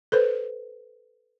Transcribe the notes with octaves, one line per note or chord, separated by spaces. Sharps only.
A4 B4 C5